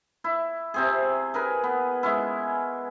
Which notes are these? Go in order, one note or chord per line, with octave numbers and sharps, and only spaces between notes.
E4
C3 C4 G#4
G#4 A#4 B4 G#5
B3
G#3 C#4 E4